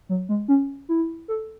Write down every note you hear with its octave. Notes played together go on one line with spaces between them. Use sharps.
F#3
G#3
C#4
E4
A4